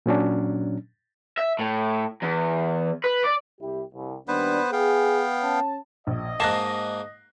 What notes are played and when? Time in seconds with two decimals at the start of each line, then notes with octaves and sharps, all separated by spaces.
0.06 A#2 F#3 C#4 D4
1.37 E5
1.59 A2
2.23 E2
3.04 B4
3.24 D5
3.61 C2 E4 G4
3.95 C2
4.28 D#2 G3 B3 D4 B4 C5
4.73 B3 G#4 F5 G5
5.42 C#4 C#5 A5
6.07 A#1 D#5
6.40 G#2 A#3 A5 F#6 A#6 C7